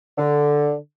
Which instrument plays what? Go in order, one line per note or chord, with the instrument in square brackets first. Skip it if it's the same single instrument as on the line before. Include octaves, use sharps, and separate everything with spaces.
[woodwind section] D3